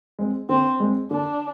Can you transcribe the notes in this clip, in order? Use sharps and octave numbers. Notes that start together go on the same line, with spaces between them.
G#3 C4
D3 C4
G#3 C4
D3 D4